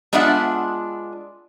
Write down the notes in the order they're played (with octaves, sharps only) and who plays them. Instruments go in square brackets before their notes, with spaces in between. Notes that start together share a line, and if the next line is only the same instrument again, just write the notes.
[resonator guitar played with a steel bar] G#3 B3 D4 F4 E5 F#5